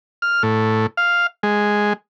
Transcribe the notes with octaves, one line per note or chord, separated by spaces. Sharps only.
F6
A2
F5
G#3